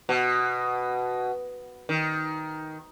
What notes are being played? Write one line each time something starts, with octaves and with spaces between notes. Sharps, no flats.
B2
D#3